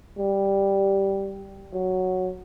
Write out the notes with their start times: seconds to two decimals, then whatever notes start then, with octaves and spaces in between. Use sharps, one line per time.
0.18 G3
1.74 F#3